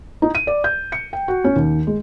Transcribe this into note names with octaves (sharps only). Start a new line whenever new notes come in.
D#4
D#7
D5
G6
C#7
G5
F#4
C#4
D#2
G#3